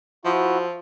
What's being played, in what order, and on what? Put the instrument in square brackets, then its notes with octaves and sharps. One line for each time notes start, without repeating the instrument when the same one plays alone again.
[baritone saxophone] F3 [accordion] E4 F#4 E5